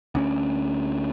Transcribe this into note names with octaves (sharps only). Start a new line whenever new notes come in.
D2 C#4